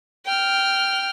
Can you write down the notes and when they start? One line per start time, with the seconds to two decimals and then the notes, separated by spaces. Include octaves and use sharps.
0.25 G5 F6